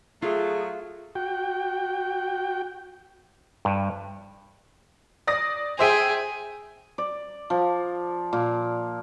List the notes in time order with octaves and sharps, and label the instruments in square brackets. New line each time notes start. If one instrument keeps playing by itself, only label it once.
[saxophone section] F#3 A3 [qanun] F4 [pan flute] G#4
[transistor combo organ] F#4 G5
[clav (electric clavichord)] G2
[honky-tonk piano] D5 D#6 A#6
[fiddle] G#4 [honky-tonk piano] C5 E5 G5
[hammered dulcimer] D5
F3
A#2